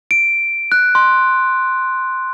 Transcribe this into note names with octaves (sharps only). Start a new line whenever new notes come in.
D7
F#6
C6